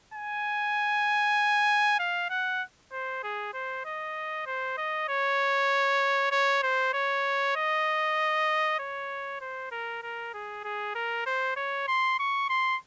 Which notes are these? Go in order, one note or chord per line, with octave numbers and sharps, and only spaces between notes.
G#5
F5
F#5
C5
G#4
C5
D#5
C5
D#5
C#5
C#5
C5
C#5
D#5
C#5
C5
A#4
A#4
G#4
G#4
A#4
C5
C#5
C6
C#6
C6